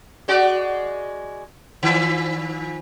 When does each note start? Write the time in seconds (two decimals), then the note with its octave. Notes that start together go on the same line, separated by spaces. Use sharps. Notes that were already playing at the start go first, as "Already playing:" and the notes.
0.28 G#3 F#4 D5
1.83 D#3 F3